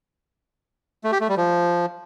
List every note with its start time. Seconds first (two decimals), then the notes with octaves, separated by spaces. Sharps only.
1.04 A3
1.12 G4
1.21 A3
1.29 G3
1.37 F3